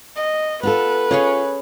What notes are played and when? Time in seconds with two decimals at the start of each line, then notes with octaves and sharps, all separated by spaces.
0.16 D#5
0.63 B3 F4 A4 B4
1.11 C#4 F4 G#4 C#5